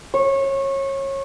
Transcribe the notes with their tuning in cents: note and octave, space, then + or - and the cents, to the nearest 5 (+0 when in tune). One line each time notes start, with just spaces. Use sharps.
C#5 -25